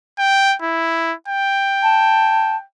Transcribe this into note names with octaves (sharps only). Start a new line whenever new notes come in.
G5
E4
G5
A5